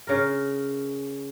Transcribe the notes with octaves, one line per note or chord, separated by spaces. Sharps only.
C#3 A#4